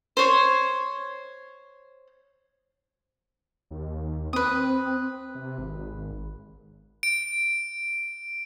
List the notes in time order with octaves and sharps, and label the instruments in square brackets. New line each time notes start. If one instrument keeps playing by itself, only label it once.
[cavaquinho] C5 C#5
[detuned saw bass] D#2
[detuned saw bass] C4 [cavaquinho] B4 D#6
[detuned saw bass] C3
G#1
[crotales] D7